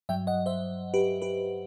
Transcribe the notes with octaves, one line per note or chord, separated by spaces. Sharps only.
G2 F#3 E5 G5
D#5 F#5
C5 E5
G4 B4
G4 B4